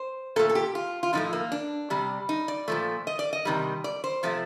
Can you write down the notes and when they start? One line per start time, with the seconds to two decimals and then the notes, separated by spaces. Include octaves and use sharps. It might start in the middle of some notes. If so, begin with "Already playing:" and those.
Already playing: C5
0.36 A#2 A3 A4
0.49 A4
0.55 G4
0.75 F4
1.03 F4
1.13 A2 F3 A3 D#4
1.33 A#3
1.52 D4
1.90 C3 G3
2.29 D#4
2.48 D5
2.68 A#2 F3 A3
3.07 D#5
3.19 D5
3.33 D#5
3.45 C3 D#3 G3
3.84 D5
4.04 C5
4.23 C3 F3 A3